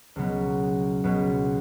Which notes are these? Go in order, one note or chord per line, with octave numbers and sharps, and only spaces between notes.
C#2 B2 F#3 B3
C#2 B2 F#3 B3